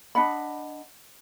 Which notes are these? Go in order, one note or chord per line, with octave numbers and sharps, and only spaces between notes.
D4 D#5 F#5 B5